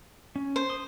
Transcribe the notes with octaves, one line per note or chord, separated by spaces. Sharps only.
C#4
C5
C6 D#6